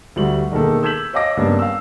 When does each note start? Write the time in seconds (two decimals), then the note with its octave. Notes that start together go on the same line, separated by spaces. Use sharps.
0.16 D2 G3 F#4 F#7
0.52 E1 D#3 A#3 A4
0.83 E6 G6 G#6 B6 E7 F#7
1.13 C#5 D#5 F5 D6 A#6
1.37 G2 C#3 G3 A#3 B3
1.59 F5 E6